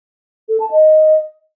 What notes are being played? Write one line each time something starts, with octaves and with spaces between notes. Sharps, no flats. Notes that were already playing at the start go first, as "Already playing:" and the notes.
A4
A5
D#5